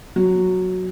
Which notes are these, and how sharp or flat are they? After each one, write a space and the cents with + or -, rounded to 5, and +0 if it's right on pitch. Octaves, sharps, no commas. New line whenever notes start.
F#3 -5